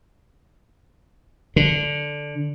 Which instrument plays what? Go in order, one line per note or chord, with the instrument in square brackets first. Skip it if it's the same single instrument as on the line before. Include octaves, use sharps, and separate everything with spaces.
[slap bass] D3